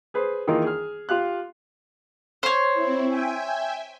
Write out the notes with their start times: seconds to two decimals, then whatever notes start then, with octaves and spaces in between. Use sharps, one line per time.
0.14 G#4 B4 C5
0.47 D#3 E3 A#3 D#4 F4 G#4
0.64 G#4 F6
1.09 F4 G4 F5 F#6
2.43 C5 C#5
2.74 C4 E4
3.07 E5 G5 G#5